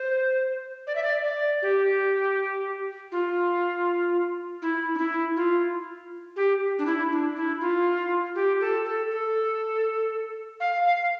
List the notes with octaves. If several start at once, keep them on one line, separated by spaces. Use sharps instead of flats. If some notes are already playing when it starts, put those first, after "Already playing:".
Already playing: C5
D5
E5
D5
D5
G4
F4
E4
D4
E4
F4
G4
D4
E4
D4
E4
F4
G4
A4
A4
A4
F5
F5